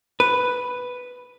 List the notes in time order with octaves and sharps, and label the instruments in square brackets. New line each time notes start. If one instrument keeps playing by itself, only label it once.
[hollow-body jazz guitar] B4